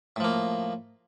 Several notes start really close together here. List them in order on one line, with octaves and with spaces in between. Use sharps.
A2 F3 A#3